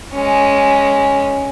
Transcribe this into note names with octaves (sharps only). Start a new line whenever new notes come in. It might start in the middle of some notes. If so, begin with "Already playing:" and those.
G#3 C#4